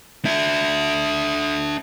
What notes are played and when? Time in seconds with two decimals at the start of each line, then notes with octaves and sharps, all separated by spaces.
0.25 D4 E5